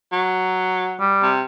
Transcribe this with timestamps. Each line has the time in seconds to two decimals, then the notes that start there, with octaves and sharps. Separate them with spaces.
0.12 F#3
1.00 G3
1.22 C3